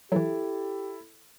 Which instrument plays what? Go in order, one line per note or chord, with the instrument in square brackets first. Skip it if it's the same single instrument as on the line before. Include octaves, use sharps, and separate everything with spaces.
[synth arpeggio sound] E3 F#3 [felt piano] E4 A4 [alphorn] G4